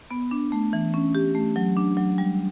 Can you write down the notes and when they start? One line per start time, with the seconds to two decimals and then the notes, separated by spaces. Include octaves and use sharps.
0.11 B3
0.31 D4
0.52 A3
0.73 E3
0.94 C#4
1.15 G4
1.35 A3
1.56 F#3
1.77 D4
1.97 F#3
2.18 G3